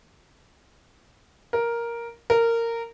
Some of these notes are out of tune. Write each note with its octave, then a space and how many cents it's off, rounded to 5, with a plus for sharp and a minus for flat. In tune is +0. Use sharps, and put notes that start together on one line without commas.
A#4 +5
A#4 -15